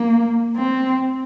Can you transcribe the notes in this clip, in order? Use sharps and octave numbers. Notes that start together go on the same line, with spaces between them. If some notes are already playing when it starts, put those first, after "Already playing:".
Already playing: A#3
C4